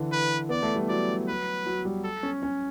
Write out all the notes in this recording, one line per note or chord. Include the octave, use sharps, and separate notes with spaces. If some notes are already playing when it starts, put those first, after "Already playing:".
Already playing: D3 E3
B4
B3 D5
A3
G3
F#3 D5
B4
F#3
G3
A4
C#4
C#4